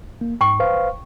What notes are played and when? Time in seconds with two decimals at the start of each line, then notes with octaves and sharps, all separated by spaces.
0.21 A#3
0.41 G#2 G5 C#6
0.60 B4 C5 F5